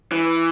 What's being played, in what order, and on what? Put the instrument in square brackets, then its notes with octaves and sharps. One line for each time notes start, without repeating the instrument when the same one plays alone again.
[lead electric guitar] E3